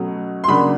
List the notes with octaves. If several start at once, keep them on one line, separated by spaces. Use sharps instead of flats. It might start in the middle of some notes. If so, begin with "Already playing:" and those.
Already playing: B2 F#3 A3 C#4
C6
C#3 F#3 A#3 D4 B5